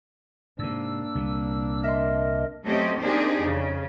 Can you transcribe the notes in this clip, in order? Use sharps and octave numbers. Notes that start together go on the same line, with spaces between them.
G#2 C3 A#3 D4 E6
C2 A#2
A#4 D#5 E5 C6
F#3 A3 C4 C#4 G4 D#5
A#3 C4 D4 D#4 G4 G#4
F2 C#3